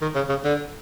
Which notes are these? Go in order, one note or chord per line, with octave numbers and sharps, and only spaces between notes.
D#3
C#3
C#3
D3